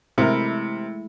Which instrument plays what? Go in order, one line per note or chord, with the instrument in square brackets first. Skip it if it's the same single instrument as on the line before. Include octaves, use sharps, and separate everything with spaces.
[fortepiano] C3 A#4 [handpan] G#3 A3 E4